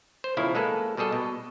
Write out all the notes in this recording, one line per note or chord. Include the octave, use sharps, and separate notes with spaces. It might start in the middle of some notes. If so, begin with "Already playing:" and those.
C5
B1 C#3 F3 E4 A#4
G#3 A#3 A4 B4
B2 G3 G#4 A4 D#5
B2